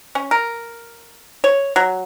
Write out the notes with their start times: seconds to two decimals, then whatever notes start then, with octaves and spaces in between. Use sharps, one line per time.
0.15 C#4
0.31 A#4
1.44 C#5
1.76 F#3